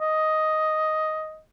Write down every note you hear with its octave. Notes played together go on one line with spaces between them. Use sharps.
D#5